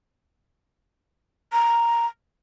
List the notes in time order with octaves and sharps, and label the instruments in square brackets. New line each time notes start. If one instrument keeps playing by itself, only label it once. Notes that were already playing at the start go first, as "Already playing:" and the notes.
[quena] A#5